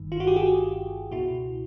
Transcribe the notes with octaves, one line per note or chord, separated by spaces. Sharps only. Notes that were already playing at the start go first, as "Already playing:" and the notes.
Already playing: G1 G2 D#3
F4
F#4
G4
F#4 G#4
C#2 B2 E4 F#4